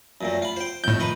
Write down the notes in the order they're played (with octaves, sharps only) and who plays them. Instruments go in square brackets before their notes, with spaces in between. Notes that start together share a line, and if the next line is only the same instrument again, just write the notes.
[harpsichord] F#2 A#2 A3
F4 B5
C5 G5
[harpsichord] F2 [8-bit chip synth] A2 G6
[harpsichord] D#3 B4 B5